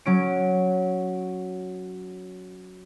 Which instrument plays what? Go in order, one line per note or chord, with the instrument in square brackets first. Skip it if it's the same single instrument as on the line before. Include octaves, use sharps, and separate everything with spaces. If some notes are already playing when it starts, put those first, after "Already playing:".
[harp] F#3 C#4 D7